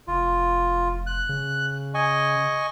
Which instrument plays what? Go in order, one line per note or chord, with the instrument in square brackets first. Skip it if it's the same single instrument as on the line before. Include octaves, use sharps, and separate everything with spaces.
[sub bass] F1 [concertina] F4
[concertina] F#6
[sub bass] C#3
[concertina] D#5 G#5 C#6